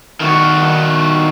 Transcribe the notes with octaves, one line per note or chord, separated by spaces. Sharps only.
D#3 F#4